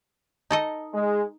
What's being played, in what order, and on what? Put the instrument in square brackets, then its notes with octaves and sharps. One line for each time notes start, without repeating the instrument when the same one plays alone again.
[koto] D#4 A4 D#5
[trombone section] G#3